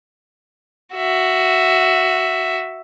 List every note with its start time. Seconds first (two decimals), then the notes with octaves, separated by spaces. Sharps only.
0.95 F#4 E5